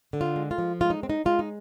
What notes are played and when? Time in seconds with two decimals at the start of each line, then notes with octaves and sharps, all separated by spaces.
0.13 D3
0.21 F4
0.36 G#3
0.51 F4
0.58 F3
0.81 G#3 F4
0.90 D#4
1.03 C4
1.10 D#4
1.25 G#3 F4
1.39 D#4